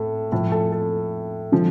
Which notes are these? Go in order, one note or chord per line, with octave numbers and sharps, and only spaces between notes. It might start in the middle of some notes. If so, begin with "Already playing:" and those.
Already playing: A2 A4
A2 F3 A4
A4
A4
D3 F3